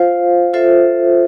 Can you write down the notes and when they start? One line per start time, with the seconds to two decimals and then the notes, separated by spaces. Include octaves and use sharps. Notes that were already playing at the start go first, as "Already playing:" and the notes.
Already playing: F4 C5 F5
0.54 F4 A4 C5 E5